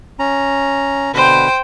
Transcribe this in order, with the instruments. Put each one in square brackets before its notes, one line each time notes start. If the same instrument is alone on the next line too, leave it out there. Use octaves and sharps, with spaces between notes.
[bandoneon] C#4 A#5
[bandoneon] B2 D3 B4 [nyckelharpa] C5 G5